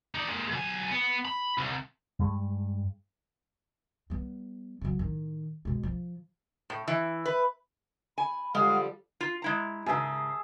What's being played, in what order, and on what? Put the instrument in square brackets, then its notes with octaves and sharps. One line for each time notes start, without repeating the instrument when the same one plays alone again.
[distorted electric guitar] D#4 D5
G#3 A#3
B1 G#5
B3
B5
C2
[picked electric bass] G2 G#3
[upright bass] G3 B3
C#3 F#3
A2 D#3
B2 G#3
F3
[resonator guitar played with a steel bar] A2
E3
B4
[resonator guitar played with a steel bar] G#5 [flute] B5
[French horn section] D3 F3 G3 [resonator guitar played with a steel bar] G#3 [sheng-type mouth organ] F5 [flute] F#5
[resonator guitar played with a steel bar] F4
G#3 E4 A#5
[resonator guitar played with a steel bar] G#2 C#3 [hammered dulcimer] G#4 E5 A5